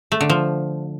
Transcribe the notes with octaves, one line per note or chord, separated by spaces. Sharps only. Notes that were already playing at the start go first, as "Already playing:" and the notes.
A3
D3
F3